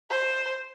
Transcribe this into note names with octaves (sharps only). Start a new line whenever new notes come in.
C5